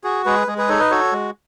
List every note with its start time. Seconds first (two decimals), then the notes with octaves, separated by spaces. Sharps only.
0.04 F#4 G#4
0.25 G#3 G#4 B4
0.47 G#3 G#4
0.58 G#4 B4
0.69 D#4 A4 C#5
0.80 B4 D#5
0.91 F#4 A4 C#5
1.12 G#3